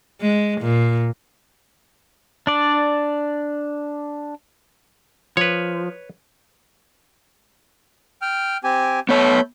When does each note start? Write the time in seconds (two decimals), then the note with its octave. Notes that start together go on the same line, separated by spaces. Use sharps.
0.21 G#3
0.61 A#2
2.47 D4 D5
5.37 F3 B4 C#5
8.22 G5 F6
8.64 C4 G4 G#5
9.09 A3 B3 C#5 B5 G6